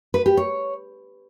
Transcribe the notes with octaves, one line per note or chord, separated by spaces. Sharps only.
B4
G4
C#5